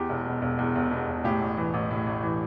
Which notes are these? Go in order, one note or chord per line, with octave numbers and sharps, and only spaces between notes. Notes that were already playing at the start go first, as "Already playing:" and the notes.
Already playing: E2 G4
E1
B2
E1
E2
E1
B2
E1
A2 G4
A1
E3
A1
A2
A1
E3